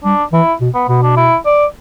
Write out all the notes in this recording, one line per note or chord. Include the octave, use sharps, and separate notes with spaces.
G3 D4
E3 E4
B2
B3
B2 B3
D4
E4
D5